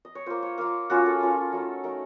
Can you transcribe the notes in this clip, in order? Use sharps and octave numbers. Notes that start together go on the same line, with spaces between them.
D#5
C#5
A#3 F4 C5
C#5
A#3 F4 F5
A#3 C#4 F4 F#4
A4
A#3 C#4 F4
F#3 A3 D#4
F#3 A3 D#4 A#4